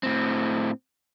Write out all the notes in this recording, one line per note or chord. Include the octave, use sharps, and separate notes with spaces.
A2 C4